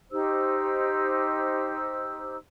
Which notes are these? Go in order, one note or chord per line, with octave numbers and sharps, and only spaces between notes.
D#4 G4 C5 E6